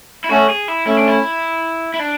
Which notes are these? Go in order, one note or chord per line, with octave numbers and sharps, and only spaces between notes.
E4
A3 C#4 F#4
G#4
E4
A3 C#4 E4
D4
E4
E4
D4